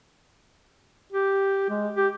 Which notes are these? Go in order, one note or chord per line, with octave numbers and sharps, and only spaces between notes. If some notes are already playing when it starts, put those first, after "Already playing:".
G4
G#3
G4